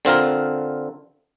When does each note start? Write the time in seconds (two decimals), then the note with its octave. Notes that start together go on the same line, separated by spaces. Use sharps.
0.05 D3 C4 F4 A#4